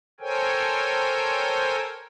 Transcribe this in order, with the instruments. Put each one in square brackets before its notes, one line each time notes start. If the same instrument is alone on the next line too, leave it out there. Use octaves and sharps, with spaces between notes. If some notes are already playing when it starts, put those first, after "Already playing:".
[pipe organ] A4 A#4 C5 C#5 G5 G#5